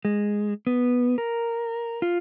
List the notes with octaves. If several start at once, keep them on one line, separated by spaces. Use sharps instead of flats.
G#3
B3
A#4
F4